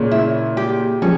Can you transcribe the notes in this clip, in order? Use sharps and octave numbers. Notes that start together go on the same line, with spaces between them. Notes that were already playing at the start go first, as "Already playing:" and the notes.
Already playing: A#2 C#3 C#5
E4
G4
C#3 F3 C#4